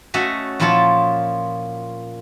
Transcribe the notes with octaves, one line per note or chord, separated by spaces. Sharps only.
A3 C#4 F#4 D#5 E5
A#2 F3 E4 F4 C#5 A5